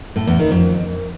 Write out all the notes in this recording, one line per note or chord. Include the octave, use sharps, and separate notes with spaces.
A2
E2
D#3
F2